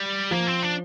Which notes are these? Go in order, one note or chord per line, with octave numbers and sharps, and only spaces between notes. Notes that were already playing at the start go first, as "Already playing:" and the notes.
Already playing: G3
F3 A#3
C4
D4